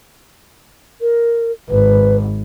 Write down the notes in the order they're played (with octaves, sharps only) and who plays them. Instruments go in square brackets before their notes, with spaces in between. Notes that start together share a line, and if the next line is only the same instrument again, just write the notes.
[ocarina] A#4
[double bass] G#1 [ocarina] B4